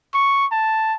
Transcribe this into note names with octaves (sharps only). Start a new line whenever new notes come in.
C#6
A5